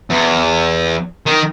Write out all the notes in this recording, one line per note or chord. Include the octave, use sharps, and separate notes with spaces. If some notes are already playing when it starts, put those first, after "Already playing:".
E2
D#3